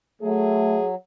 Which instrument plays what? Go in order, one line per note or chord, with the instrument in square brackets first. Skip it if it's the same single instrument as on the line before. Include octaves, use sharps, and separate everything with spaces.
[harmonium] F#3 [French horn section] A3 [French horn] G#4